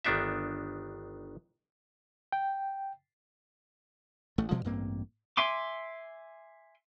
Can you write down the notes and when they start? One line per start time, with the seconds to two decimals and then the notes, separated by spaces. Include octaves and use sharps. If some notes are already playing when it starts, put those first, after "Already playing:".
0.04 G1 D#3 B3 D4 D#4 E5
2.32 G5
4.38 A1 A3
4.51 B2 F3 G3 G#3
4.65 A1 G2 A#3 C4
5.37 E5 G#5 C6 D6